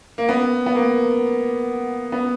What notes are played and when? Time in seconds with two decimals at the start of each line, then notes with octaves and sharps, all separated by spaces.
0.18 A#3
0.29 B3
0.66 B3
0.75 A#3
2.12 B3